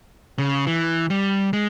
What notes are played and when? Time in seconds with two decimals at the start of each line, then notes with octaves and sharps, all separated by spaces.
0.38 C#3
0.67 E3
1.10 G3
1.53 G#3